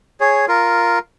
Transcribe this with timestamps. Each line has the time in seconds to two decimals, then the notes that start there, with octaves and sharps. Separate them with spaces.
0.20 G#4 C#5
0.48 F4 A#4